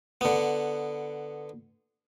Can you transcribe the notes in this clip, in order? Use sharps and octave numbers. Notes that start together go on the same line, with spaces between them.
D3 B3